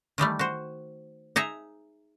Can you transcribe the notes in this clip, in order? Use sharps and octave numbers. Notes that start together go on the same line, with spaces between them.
D#3 E3 G3 A3
F#4 C5
D#4 G#4 E5 A#5